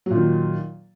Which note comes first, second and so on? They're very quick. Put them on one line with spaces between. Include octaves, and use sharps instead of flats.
F#3 A#2 D#3